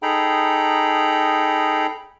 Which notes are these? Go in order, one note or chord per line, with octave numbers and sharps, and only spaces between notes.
D#4 G#4 A4 G5 A#5 B5